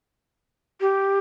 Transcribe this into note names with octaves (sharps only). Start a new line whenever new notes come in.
G4